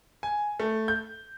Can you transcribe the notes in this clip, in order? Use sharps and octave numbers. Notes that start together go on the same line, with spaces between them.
G#5
A3
G6